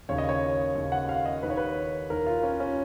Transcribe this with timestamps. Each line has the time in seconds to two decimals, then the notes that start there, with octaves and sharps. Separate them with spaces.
0.09 D#2 C#3 C#5
0.18 D#5
0.29 C#5
0.75 D#2 C#3
0.92 F#5
1.09 F5
1.26 D#5
1.43 D#2 D#3 B4
1.50 C#5
1.57 B4
2.10 D#2 D#3 A#4
2.26 F4
2.43 C#4
2.60 C#4